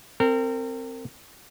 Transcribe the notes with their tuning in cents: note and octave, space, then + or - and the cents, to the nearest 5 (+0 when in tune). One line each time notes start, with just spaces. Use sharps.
C4 +0 A#4 -35